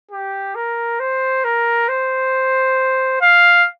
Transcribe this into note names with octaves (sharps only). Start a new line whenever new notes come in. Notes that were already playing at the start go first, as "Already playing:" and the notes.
G4
A#4
C5
A#4
C5
F5